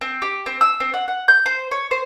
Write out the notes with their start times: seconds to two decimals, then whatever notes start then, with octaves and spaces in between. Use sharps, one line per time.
0.01 C4
0.22 G4
0.46 C4
0.61 E6
0.80 C4
0.94 F#5
1.08 F#5
1.28 G6
1.46 C5
1.71 C#5
1.91 C5